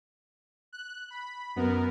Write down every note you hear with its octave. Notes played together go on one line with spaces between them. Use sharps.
F#6
B5
F#2 B3 A#4